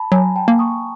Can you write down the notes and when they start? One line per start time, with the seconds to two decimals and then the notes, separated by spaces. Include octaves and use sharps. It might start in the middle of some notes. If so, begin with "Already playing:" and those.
Already playing: A5 B5
0.12 F#3 G#5 A#5
0.36 G5 A5
0.48 A#3
0.59 C#6 D#6